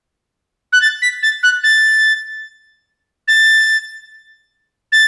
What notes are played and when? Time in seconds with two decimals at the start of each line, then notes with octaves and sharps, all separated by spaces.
0.73 F#6
0.81 A6
1.02 B6
1.23 A6
1.43 F#6
1.63 A6
3.28 A6
4.92 A6